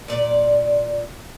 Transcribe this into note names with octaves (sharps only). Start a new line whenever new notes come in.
A#2 D5